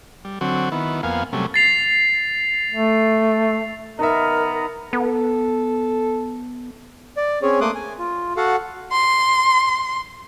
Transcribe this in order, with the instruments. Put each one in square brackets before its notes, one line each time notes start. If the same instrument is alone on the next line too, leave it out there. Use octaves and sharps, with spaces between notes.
[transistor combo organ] G3
D3 F#3 C4 F#4
D#3 B3 E4
F2 A#3 B3 F5 G#5
C3 F#3 G3 A3 C#4
[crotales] A6 C7 F7
[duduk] A3
[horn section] D#3 B3 A#5 [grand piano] D#4 E5 [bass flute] A#4
[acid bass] B3 [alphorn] A4
[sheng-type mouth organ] D5
C4 C#4 G#4 C#5
A3 A#3 C6 D6 D#6 F#6
G#5
F4
F#4 A4 F5 F#5
[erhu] C6